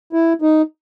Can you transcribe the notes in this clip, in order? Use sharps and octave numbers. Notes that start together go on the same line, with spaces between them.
E4
D#4